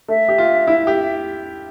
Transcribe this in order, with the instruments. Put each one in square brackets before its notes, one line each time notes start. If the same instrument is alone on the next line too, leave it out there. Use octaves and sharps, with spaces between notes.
[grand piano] A3 [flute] E5
[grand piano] G4
F4
E4
G4